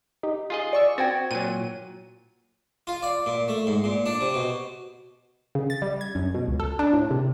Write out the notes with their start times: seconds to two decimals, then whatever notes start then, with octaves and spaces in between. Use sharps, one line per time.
0.23 D#4 G4
0.50 F4 G#4 D#5
0.73 D5 C#6 E6
0.98 C4 F#4 G5 G#6 A6
1.31 A#2 F#3 D#7
2.87 F4
3.03 D5
3.26 A#2
3.48 A3
3.67 G#2
3.84 A#2
4.06 D4
4.21 C3
4.34 B2
5.55 C#3
5.70 A6
5.82 G3
6.01 G#6
6.15 F#2
6.34 B2
6.48 C#2
6.60 A4
6.79 D4
6.93 A2
7.11 C3